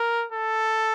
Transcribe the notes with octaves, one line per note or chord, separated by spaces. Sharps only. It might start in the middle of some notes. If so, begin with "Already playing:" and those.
Already playing: A#4
A4